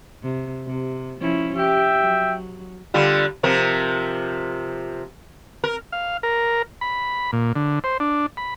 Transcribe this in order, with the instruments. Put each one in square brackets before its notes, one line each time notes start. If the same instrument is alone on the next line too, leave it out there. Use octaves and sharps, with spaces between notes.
[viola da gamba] C3
C3
F3 C#4 E4
[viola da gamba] G4 [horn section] E5 G5
[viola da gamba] F#3
[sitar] D3 G3 F4
C3 F3 A#4
A#4
[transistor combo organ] F5
A#4
B5
A#2
D3
C5
D4
B5